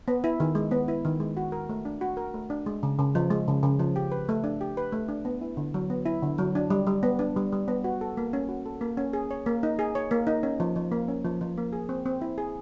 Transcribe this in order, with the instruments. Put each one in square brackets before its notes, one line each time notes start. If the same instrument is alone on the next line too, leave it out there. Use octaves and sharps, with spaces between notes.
[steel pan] B3
E4
D#3
G#3
B3
E4
D#3
G#3
F#4
A#4
A3
D4
F#4
A#4
A3
D4
G#3
C#3
C#3
F3
G#3
C#3
C#3
F3
G4
B4
A3
D4
G4
B4
A3
D4
B3
E4
D3
F#3
B3
E4
D3
F#3
D4
G3
G3
B3
D4
G3
G3
B3
F#4
A4
A#3
C#4
F#4
A4
A#3
C#4
G#4
C#5
A#3
D#4
G#4
C#5
A#3
D#4
C#4
F3
F3
A#3
C#4
F3
F3
A#3
G#4
C4
C4
E4
G#4